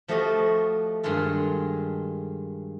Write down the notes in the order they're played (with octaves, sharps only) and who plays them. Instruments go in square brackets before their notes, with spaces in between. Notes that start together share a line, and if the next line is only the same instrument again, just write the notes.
[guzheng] F3 A3 F#4 G4 D#5
G2 D#3 G#3 F4 A4